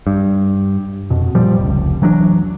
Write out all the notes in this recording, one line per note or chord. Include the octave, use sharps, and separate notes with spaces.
G2
F2 B2
A#2 F3 G3
F1 C#2
E3 F#3 A#3 D4